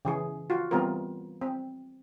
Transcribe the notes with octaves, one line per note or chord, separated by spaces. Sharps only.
C#3 E3 G#4
F4 F#4
E3 G3 B3 C4 F4 A#4
C4